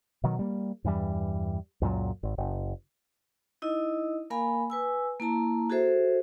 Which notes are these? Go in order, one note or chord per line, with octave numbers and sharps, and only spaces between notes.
B2 D#3 F#3
G3 A#3
E2 G2 E3 G3
C#2 F#2 A#2 F#3
G#1
F#1
D#4 E4 D#5
A#3 A#4 F5 G#5 B5
B4 G#5 E6
A#3 E4 A5 A#5
F#4 G#4 A4 C5 E5